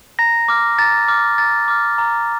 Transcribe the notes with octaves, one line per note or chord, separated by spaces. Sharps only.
A#5 A#6
D6 F6
A#5 A6
D6 F6
A#5 A6
D6 F6
A#5